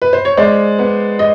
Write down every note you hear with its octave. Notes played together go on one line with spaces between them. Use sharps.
B4
C5
C#5
G#3 C5 D5
B3
D#5